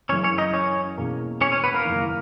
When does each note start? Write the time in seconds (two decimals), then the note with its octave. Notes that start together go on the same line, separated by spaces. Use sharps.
0.09 F#1 F#2 C#3 E3 C#4 C#5
0.24 C#4 C#5
0.38 D#4 D#5
0.53 C#4 C#5
0.97 E2 B2 A#3 C#4 G#4
1.41 C#4 C#5
1.52 C#4 C#5
1.64 B3 B4
1.74 A#3 A#4
1.85 F#1 E2 D#3